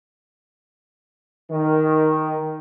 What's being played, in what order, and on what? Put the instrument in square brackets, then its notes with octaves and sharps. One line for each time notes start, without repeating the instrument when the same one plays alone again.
[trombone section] D#3